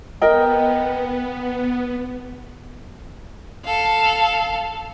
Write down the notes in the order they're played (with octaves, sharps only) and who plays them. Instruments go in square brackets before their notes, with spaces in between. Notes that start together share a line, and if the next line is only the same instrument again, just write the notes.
[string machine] B3 [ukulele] A#4 D#5 G5
[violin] A4 F5